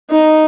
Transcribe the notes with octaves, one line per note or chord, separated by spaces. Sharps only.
D#4